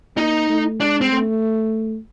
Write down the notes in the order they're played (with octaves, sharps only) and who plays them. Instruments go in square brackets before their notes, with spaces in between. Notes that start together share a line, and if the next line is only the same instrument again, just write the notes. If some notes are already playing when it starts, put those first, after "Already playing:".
[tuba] A#3 [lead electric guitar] D#4
[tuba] A3
[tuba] G#3 [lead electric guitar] D4
[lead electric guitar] C4
[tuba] A3